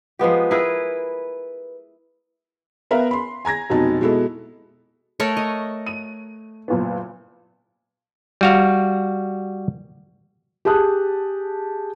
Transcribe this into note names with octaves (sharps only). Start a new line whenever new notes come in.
F3 G#3 B3 G4
E4 G#4 A#4 B4
B3 A#4 B4 E5 F5 A#5
B5 C6
G#5 A#5 G#6 A#6
F1 B2 F#3 B3 D#4 A5
B2 G#3 B3 E4 A4
A3 A#4 C#5
D#5
D#7
F#1 A#2 B3
G3 F#4 F5
G4 G#4 A5 D#6 F#6